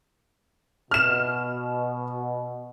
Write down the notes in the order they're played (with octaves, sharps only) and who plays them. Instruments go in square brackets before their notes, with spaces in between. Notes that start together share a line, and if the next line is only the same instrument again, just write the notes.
[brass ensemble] B2 [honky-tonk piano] F6 E7